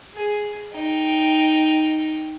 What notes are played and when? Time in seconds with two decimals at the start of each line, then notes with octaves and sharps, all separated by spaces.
0.14 G#4
0.73 D#4 G5